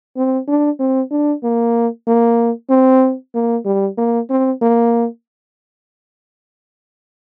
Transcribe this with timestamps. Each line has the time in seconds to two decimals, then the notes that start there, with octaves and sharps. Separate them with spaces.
0.16 C4
0.48 D4
0.79 C4
1.10 D4
1.43 A#3
2.07 A#3
2.70 C4
3.35 A#3
3.65 G3
3.97 A#3
4.30 C4
4.62 A#3